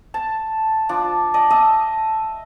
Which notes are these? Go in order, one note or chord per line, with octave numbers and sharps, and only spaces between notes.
A5
F3 D4
D5 D#5 A5
D#5 E5 A5 D#6